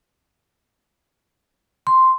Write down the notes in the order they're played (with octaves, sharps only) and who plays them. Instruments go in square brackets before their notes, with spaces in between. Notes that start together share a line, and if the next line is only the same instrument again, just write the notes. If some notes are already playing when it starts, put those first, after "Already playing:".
[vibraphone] C6